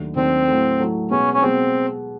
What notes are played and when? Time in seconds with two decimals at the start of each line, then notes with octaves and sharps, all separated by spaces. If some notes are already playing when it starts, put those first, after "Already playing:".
Already playing: D#2 D#3 F#3 A3 D4
0.16 D#2 D#3 F#3 A3 C4 D4
0.48 A2 F#3 A3
0.79 A2 F#3 A3
1.11 B2 G#3 B3 C#4
1.33 C#4
1.42 B2 G#3 B3 C4